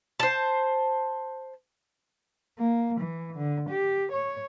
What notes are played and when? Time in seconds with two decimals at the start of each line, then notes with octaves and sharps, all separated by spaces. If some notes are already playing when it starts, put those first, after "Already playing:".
0.20 C5 A5
2.59 A#3
3.01 E3
3.36 D3
3.70 G4
4.12 C#5